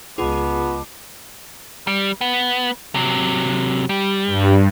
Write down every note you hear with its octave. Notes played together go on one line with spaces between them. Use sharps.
C#2 B3 F4 G#4 D#5 A5 D6
G3
B3
C3 F#3
G3
G2